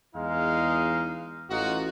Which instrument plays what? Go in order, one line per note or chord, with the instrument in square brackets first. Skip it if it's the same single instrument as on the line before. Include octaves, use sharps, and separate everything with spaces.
[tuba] E2 [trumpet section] G#3 D#4 F5
[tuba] A1 [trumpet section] D#4 F4 F#4